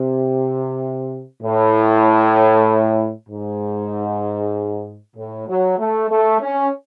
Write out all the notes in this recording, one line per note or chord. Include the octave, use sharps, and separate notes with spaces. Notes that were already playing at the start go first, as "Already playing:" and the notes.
Already playing: C3
A2
G#2
A2
F#3
A3
A3
C#4